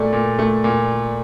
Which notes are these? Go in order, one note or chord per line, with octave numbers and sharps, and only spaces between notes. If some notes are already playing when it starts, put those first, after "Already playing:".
Already playing: A#2 A3 D5
A#2
A3
A#2